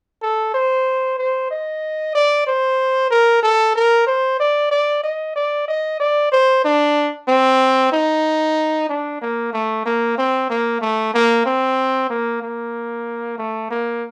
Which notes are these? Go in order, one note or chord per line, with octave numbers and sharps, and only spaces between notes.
A4
C5
C5
D#5
D5
C5
A#4
A4
A#4
C5
D5
D5
D#5
D5
D#5
D5
C5
D4
C4
D#4
D4
A#3
A3
A#3
C4
A#3
A3
A#3
C4
A#3
A#3
A3
A#3